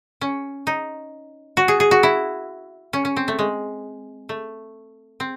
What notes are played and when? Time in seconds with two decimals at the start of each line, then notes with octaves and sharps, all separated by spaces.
0.21 C#4
0.67 D#4
1.57 F#4
1.68 G#4
1.80 G#4
1.91 F#4
2.03 E4
2.93 C#4
3.05 C#4
3.17 C4
3.28 A3
3.39 G#3
4.29 A3
5.20 C4